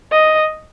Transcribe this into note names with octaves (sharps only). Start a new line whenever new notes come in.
D#5